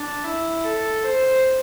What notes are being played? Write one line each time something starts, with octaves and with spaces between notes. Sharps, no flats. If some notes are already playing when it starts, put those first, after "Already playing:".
Already playing: D4
E4
A4
C5